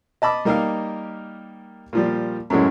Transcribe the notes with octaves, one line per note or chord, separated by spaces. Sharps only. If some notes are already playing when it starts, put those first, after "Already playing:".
D#5 A5 B5 D6
G3 A#3 D#4 G4 A#4 F5
A#2 F3 G3
F#2 A2 E3 F#3 G#3 C#4